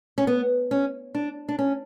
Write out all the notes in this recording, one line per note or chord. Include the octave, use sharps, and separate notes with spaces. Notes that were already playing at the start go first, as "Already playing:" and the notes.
C#4
B3
C#4
D4
D4
C#4